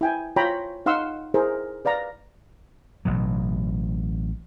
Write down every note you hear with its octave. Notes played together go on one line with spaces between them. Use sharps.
E4 G5 G#5
F4 C#5 G5 A#5 B5
D#4 F5 F#5 C6 E6
E4 G#4 A#4 C5
B4 D5 F5 A#5
A1 B2 F#3